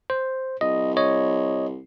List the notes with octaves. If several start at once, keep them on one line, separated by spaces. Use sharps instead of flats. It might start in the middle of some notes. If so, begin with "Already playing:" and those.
C5
C2 D#5
C#5 D#5